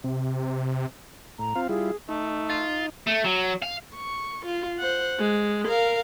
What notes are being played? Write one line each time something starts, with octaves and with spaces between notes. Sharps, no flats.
C3
A2 A#5
C4 F4 F5
G3 E4 F4 G#4
A3 D#4
F4
A3
F#3
F5
C#6
F4
C5 F#5
G#3
A#4 F5